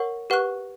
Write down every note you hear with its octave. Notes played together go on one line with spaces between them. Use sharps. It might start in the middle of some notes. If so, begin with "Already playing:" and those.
Already playing: A#4 C#5 F#5 C#6
G4 B4 F#5 C#6 F#6